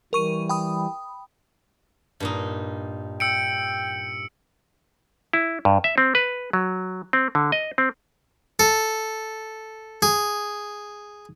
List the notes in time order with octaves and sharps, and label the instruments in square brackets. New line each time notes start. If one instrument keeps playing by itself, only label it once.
[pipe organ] E3 G3 [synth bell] A#4 C#6 D#7
[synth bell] G5 B5 D#6
[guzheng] G2 A#2 D#4
[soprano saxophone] G5 [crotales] E6 C#7 D7
[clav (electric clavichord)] E4
G2
E5
C4
B4
F#3
C4
D3
D#5
C4
[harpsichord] A4
G#4